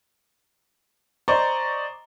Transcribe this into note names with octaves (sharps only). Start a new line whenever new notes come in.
C5 D5 D#5 A#5 C#6